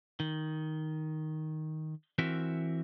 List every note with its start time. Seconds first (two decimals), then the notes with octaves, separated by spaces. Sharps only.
0.20 D#3
2.18 E3 C4 F#4 A#4 E5